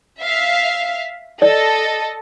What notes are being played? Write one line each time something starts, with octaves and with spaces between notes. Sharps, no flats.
E5 F5
A4 D5 D#5